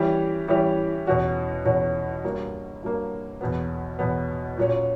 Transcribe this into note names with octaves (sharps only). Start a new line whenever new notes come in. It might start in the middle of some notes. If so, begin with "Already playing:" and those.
Already playing: E3 G3 C#4 G4
E3 G3 C#4 G4
E2 B2 F#3 C#4 F#4
E2 B2 F#3 C#4 F#4
G2 F#3 A#3
G2 F#3 A#3
E2 B2 F#3 B3
E2 B2 F#3 B3
A#2 F#3 C#4